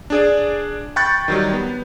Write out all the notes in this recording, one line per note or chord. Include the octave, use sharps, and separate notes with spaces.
D4 G#4 D5
G5 B5 C#6 F#6 G6 A6
D#3 F#3 G3
B3